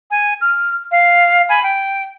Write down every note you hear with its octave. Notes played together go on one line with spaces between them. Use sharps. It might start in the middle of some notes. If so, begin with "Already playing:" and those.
G#5
F6
F5
G#5 B5
G5